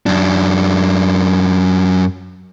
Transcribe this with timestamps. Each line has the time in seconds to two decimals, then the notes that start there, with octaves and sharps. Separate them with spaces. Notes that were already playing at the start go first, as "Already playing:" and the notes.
0.06 F#2 D4